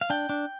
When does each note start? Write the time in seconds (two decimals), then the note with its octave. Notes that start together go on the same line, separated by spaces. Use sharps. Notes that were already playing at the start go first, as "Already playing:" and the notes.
0.01 F5
0.10 D4 G5
0.29 D4